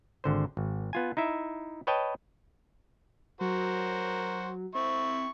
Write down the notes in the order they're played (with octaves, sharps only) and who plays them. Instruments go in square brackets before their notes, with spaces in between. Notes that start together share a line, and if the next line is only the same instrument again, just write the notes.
[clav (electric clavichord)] G#1 D3 C5
G#1
B3 F4 G#5
D#4 E4 E5
B4 C#5 D#5 G5 A5
[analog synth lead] F#3 [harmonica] F#4 A#4 C5
[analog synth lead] C4 [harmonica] E4 C#6